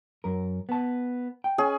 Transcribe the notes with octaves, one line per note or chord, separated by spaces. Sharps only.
F#2 A#4
B3 A5
G5
C#4 G#4 G#5